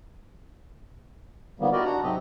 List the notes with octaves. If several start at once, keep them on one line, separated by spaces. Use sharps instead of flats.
D3 D#3 F3 G3 A#3 B3
E4 F#4 G4 A#4 D5 D#5
D4 F#4 F#5 A#5
G#2 C3 F#3 C4 G4 D#5